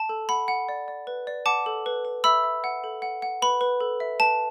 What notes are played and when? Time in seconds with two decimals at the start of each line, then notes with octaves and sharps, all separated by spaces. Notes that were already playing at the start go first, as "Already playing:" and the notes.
Already playing: A5
0.09 A4
0.29 F#5 B5
0.48 F#5
0.69 D5
0.88 D5
1.07 B4
1.27 D5
1.46 F#5 A5 D6
1.66 A4
1.86 B4
2.05 B4
2.24 E5 B5 E6
2.44 E5
2.64 F#5
2.84 A4
3.02 F#5
3.22 F#5
3.42 B4 B5
3.61 B4
3.80 A4
4.00 E5
4.19 B4 A5